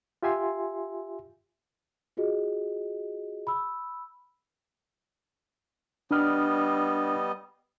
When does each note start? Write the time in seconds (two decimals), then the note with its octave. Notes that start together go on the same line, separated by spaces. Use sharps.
0.23 F4 G4 E5 G#5 C6
2.17 F4 F#4 G#4 D#5
3.47 B5 E6
6.11 G3 B3 D4 D#5 F6